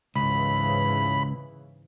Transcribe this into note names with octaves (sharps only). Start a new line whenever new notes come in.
C#2 G#2 C#3 E3 B5